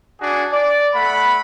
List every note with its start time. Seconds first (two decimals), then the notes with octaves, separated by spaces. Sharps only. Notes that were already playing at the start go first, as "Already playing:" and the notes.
0.21 D4 F#4 G#4
0.52 D5
0.95 A3 F#5 B5